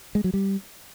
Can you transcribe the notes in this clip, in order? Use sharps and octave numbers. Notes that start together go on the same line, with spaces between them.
G#3
F#3
G3